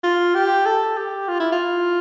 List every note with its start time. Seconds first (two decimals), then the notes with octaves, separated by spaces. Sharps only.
0.04 F4
0.35 G4
0.66 A4
0.97 G4
1.28 F4
1.40 E4
1.52 F4